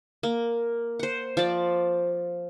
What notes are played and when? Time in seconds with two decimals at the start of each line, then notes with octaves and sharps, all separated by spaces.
0.23 A#3
0.99 C5 F#5
1.37 F3 D5